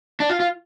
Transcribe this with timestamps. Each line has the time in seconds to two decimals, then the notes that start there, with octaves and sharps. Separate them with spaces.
0.20 D4
0.29 F4
0.40 F4